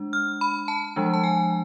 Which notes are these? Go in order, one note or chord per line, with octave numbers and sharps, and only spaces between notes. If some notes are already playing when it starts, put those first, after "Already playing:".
Already playing: G#3 D4
F6
B5
A5
F3 G#3 D4
A5
G#5